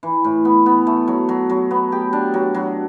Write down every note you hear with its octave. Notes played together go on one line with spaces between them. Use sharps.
E3
A2
B3
B3
A3
F#3
F#3
F#3
B3
G4
D4
F#3
F#3